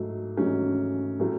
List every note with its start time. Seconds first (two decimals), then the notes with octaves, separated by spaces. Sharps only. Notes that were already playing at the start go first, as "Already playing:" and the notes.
Already playing: G#2 F#3 A3
0.37 G#2 F#3 A3 C#4
1.19 A2 F#3 A3